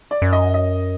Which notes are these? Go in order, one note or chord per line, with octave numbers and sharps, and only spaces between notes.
D5
F#2
D#5
D#5